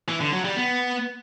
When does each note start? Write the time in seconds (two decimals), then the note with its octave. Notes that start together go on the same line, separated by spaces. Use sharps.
0.09 E3
0.21 D3
0.33 F#3
0.45 G3
0.57 B3